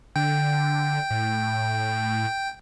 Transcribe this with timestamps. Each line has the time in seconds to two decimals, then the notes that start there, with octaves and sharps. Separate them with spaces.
0.16 D3 G5
1.11 A2